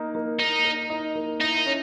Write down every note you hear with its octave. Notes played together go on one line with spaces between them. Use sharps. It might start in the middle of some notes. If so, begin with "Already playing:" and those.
Already playing: A#3 D#4 A#4
A#3
A#3 D#4
A#4
D#4
A#3
D#4 E4
C#4